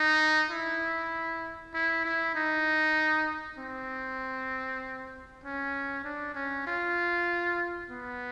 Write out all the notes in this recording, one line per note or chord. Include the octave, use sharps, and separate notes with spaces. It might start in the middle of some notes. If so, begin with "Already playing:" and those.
Already playing: D#4
E4
E4
E4
D#4
C4
C#4
D4
C#4
F4
B3